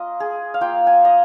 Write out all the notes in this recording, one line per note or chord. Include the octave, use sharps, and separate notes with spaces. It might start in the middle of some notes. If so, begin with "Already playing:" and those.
Already playing: A#3 F4 D#5
G#4
F5
A#3 F4 G5
G#5
D#5